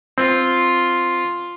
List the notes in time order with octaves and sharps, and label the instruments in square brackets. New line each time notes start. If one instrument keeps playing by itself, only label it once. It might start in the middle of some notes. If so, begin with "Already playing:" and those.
[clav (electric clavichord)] C4 [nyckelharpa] F4